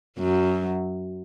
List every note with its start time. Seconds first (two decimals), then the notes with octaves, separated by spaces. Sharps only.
0.19 F#2 F#3